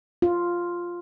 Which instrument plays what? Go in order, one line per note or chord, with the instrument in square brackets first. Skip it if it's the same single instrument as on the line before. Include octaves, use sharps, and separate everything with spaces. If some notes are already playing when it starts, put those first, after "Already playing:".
[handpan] F4